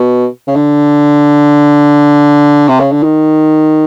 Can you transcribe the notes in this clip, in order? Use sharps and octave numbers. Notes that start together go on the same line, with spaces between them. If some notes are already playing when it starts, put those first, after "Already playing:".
Already playing: B2
C#3
D3
C3
C#3
D3
D#3